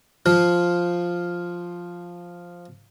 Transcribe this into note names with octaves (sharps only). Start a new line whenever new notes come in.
F3 F4